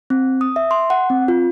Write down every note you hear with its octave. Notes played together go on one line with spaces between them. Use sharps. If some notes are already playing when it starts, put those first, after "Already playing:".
C4
D#6
E5
C6
F#5
C4
F4